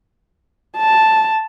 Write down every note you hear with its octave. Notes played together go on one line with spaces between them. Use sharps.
A5